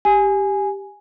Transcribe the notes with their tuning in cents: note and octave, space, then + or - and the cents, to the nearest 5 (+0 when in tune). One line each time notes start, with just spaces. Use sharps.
G4 +0 G#5 +0